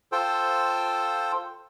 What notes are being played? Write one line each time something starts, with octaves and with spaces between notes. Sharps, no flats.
F4 A4 C5 G5